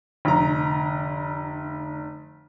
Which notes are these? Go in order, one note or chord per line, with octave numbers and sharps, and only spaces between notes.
F1 D3 A#5